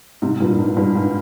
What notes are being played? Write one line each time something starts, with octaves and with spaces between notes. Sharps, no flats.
G#2 C3
G2 A#2
G#2
G2
G#2